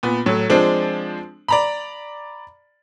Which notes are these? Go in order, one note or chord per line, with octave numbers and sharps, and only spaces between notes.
A#2 B3
A2 F#3
F3 G#3 C4 D4
D5 A#5 B5